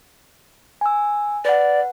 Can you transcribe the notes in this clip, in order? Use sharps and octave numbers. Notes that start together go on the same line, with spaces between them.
G#5 E6
B4 D5 F#5